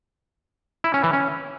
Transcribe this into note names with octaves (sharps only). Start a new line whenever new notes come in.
E4
C#4
E3
C#4